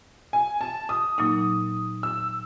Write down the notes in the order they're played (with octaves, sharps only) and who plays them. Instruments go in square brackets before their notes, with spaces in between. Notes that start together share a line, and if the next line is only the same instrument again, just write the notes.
[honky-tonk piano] G#5
A5
D#6
[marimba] A#2 F#3 A#3 D#4 [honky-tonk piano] D#6
[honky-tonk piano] E6